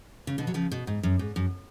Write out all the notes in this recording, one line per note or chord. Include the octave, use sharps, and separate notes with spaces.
C#3
B2 D3
F#3
C#3 F3
B2
G#2
F#2
G#2
F#2